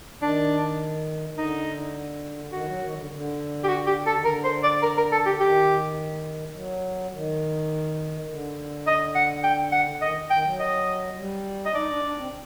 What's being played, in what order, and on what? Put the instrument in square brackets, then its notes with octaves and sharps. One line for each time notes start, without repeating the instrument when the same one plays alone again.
[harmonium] D#3 [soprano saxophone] D4
[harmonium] D3 [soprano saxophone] D#4
[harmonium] D#3 [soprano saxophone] F#4
[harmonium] F#3
D#3
D3
D3
[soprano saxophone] G4
F#4
G4
A4
[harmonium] D#3
[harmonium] D3 [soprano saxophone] A#4
[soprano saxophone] C5
D5
A#4
A#4
A4
G4
[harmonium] D#3 [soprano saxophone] G4
[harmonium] F#3
D#3
D3
[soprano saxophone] D#5
F#5
G5
F#5
[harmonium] D#3 [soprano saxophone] D#5
[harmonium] D#3 [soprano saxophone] G5
[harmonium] F#3
[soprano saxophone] D#5
[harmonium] G3
[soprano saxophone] D#5
[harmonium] D#4 [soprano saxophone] D5
[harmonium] D4
D4
C4